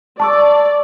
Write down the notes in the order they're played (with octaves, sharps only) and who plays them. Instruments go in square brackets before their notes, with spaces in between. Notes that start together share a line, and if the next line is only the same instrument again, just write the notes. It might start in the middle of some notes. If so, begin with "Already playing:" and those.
[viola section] D5 [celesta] A5 C#6 E6